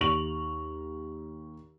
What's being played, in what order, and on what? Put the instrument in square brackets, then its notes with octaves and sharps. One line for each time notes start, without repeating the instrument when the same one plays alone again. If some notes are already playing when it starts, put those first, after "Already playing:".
[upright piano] D#2 C#6 F7 F#7